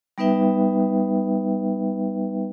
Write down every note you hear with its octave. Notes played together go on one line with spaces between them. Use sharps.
G3 B3 D#4 B4 E5 G5